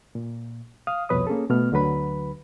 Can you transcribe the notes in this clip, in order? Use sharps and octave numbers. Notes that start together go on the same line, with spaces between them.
A#2
F5 D#6 F6
C2 F2 B2 B4 C#5 D#6
A#3 C#4 G#4 A4
B2 A3 B3 F6
D2 D3 F#3 B4 B5